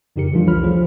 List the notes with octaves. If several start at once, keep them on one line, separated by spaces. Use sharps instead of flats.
F2 C#3 D#4 G4 A#4 C#7
E3 F3 G3 A3 D4 F4
C2 E3 A4 C#5 B5 F6
F3 F4 G#4 C5